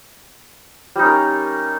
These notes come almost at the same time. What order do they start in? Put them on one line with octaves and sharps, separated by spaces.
G3 D#4 C#4 A#4